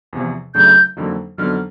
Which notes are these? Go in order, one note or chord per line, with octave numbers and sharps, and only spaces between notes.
E2 C3 F3
F#2 C#3 F#3 A3 D4 G6
F2 D3 F#3 A#3 D#4
F2 D3 F#3 B3 D#4 F6